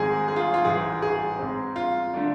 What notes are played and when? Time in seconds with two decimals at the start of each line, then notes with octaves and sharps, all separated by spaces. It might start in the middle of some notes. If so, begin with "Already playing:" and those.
Already playing: G#1 G#2 F3 G#3 G#4
0.28 G#4
0.36 F4
0.54 F4
0.65 A1 G#2 E3 G#4
1.02 G#4
1.39 G#2 G#3 C4
1.76 F4
2.14 D3 A3 D4 F4